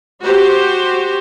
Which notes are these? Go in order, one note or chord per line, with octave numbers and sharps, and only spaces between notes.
F#4 G4 C5